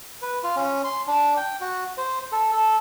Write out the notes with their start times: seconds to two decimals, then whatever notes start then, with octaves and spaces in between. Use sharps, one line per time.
0.22 B4
0.43 F4
0.56 C#4
0.84 C6
1.07 D4
1.37 G5
1.61 F#4
1.98 C5
2.32 A4
2.52 A4